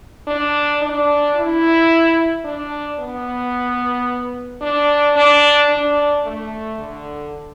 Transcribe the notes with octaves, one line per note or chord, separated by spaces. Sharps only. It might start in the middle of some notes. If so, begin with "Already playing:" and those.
D4
D4
E4
D4
B3
D4
D4
D4
A3
D3